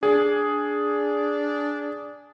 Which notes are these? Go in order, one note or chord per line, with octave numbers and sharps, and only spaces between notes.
D4 G#4